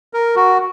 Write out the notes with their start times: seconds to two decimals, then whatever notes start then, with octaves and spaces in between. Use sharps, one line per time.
0.13 A#4
0.36 F#4